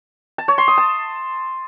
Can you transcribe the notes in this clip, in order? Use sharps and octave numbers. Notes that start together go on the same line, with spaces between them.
A5
C#5
C6
D#6
A5